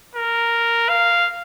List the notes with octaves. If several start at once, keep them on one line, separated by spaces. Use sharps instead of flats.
A#4
F5